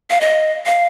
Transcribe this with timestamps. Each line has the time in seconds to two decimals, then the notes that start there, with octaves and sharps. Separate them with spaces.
0.10 F5
0.21 D#5
0.66 F5